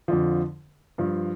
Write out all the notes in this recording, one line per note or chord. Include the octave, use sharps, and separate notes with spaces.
F2 D3 F3
G2 F3